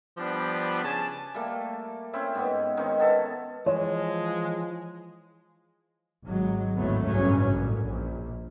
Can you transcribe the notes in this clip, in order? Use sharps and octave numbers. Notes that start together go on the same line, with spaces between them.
F3 G3 B3 D4
C#3 G#5 A5
G3 A3 A#3
C4 C#4 E4 E5
G#2 B3
D#3 C4 C#4 D#4
B3 A4 E5
E3 F3 G#3 C#5
G#1 F#3 G#3
G#1 D2 A2 F#3 A3 B3
A1 G2 C#3 F#3 C#4
A1 A#2
A#1